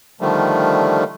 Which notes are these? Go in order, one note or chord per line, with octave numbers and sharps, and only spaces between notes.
D3 D#3 F3 G3 A3